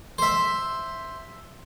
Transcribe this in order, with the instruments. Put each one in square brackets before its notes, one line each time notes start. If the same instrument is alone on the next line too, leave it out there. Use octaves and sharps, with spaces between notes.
[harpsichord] C5 E5